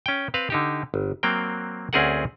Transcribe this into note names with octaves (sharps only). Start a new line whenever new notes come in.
C#4 G5
C4 B4 F5
D3 D#4 G4
G1
F#3 A#3 C4 G5
D2 C4 C#4 G#4 A#4 F#5